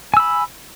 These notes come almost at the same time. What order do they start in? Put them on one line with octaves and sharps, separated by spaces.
G#5 E6 B5